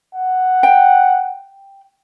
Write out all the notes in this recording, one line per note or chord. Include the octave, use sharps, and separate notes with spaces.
F#5
G5